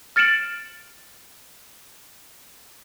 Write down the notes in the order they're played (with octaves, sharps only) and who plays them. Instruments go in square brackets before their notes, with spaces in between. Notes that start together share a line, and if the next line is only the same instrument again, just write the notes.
[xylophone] F6 A6 C#7 D7 E7 F#7